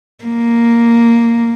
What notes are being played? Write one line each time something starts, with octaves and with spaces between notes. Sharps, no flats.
A#3